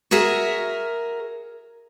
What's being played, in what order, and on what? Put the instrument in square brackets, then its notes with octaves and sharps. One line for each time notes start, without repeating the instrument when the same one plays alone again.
[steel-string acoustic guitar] F#4 G#4 A#4 E5